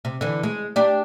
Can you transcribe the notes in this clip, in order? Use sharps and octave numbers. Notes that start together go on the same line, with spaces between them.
C3
D3 E3
G#3
D4 G4 D5